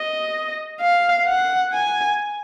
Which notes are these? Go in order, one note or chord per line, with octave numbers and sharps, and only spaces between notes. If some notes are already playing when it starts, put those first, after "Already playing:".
Already playing: D#5
F5
F#5
G#5